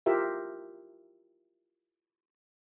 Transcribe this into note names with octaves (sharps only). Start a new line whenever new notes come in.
E4 F4 G4 A#4 E5